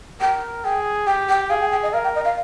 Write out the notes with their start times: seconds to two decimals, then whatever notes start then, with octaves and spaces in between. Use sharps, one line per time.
0.21 A#4 G5
0.64 G#4 G5
1.07 G4 G5
1.29 G5
1.50 G#4 F5
1.61 G5
1.72 G5
1.83 D#5
1.93 A#4 F5
2.04 G5
2.15 D#5
2.25 F5